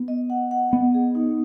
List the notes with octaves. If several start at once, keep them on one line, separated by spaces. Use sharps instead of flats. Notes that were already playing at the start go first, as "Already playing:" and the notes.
Already playing: B3
D#5
F#5
F#5
B3 D#5
G#4
D#4